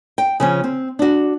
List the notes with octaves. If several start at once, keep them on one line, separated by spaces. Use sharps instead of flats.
G5
C#3 F3 C#4
C4
D4 F#4